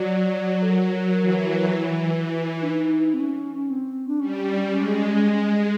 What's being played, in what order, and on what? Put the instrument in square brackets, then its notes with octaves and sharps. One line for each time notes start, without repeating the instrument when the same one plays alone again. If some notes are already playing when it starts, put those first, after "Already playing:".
Already playing: [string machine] F#3 [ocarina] D5
[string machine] F#3
[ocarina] A4
A#4
[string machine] E3
[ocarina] E4
D4
D#4
C4
C#4
C4
D4
[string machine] G3 [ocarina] C#4
[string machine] G#3